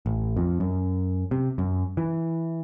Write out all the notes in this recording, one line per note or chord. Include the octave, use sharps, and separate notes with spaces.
A1
F2
F#2
C3
F#2
E3